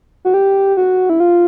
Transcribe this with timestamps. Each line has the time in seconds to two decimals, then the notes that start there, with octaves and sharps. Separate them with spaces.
0.25 F#4
0.34 G4
0.77 F#4
1.10 E4
1.20 F4